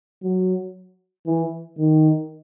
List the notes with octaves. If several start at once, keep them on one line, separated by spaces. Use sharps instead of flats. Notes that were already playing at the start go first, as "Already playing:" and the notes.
F#3
E3
D#3